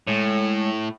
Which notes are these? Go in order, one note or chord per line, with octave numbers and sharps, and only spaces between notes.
A2 G#3 A4 C#5